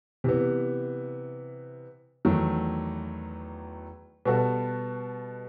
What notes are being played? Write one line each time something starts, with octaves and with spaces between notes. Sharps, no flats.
C3 E3 B3
E2 D#3 F#3 A3
B2 G3 B3 F#4 A4